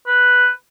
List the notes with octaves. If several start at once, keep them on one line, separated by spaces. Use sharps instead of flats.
B4